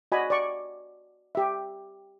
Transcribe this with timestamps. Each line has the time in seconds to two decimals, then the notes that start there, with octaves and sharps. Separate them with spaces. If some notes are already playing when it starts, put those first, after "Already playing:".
0.12 F#4 D5 D#5 G#5 B5
0.30 D5 C#6
1.35 G4 E5